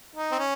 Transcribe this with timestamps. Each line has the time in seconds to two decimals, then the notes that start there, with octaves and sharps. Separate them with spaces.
0.16 D#4
0.31 C4
0.39 C#4